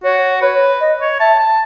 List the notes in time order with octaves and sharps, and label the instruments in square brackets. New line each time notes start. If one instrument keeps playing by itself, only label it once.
[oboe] F#4 [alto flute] C#5
[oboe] B4 [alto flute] C#5
[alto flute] D#5
[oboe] C#5
[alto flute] E5 [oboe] A5
[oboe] A5